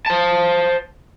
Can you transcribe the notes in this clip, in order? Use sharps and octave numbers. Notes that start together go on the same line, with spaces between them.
C5 A5